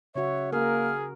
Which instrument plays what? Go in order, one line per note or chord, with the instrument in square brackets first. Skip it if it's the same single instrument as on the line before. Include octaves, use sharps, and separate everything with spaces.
[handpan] C#3 F#4 [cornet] C#5 [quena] E5
[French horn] A#3 [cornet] G#4 [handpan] A#4 [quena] F6